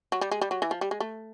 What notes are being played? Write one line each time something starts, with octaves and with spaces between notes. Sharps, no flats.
F#3
G3
G#3
G3
F#3
E3
F3
G3
G#3
A3